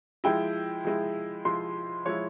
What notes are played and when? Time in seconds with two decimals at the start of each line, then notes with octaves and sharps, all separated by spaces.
0.24 F3 G#3 E4 G5
0.85 F3 G#3 E4
1.45 F3 G#3 E4 C6
2.05 F3 G#3 E4 C#5